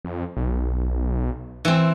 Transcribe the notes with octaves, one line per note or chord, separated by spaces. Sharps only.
F2
B1
E3 C4